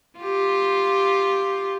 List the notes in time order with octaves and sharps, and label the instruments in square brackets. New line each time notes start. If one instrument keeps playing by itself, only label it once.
[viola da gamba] F4 G4